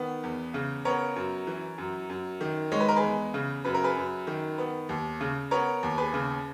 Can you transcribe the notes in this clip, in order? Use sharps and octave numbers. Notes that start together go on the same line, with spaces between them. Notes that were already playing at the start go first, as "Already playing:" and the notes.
Already playing: D#3 B3
E2
C#3
B3 A#4 C#5
F#2
E3
F#2
F#2
D#3
G#3 C#5
B4
A#4
G#4 B4
E2
C#3
F#2 B4
A#4
G#4 B4
F#2
D#3
B3
D#2
C#3
B3 A#4 C#5
D#2
G#4 B4
C#3